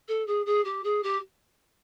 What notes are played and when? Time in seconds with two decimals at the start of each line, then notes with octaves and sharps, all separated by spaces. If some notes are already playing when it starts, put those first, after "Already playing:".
0.08 A4
0.27 G#4
0.46 G#4
0.64 G4
0.84 G#4
1.03 G4